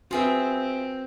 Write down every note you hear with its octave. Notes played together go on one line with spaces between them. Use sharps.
C4 F4 F#4 G#4 B4 E5